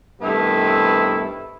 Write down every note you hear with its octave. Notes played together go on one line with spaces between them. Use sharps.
G2 C3 D#3 A3 B3 E4